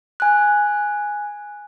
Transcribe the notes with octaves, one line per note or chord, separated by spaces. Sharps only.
G#5 F#6